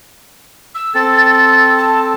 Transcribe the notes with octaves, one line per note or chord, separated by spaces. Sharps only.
E6
C4 A4 A6
A6
A5